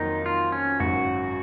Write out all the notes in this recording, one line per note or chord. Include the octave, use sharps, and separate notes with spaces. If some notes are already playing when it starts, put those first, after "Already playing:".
Already playing: F2 D#3 F#3 A#3 D#4 F4
F4
C#4
G#1 F#2 C#3 F#3 F#4